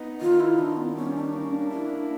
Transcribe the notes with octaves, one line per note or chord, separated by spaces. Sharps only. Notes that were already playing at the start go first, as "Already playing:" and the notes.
Already playing: B3 D#4
D#3 F4
E4
D#3 D4
B3
G3 C#4
D4
A#3 C#4
D4
D4 E4